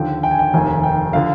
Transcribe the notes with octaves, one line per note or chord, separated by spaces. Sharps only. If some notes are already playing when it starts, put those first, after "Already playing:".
Already playing: D#2 D3 F3 G5
G5
G#5
G5
F1 D#2 D#3 G#5
G5
D3 F3 F5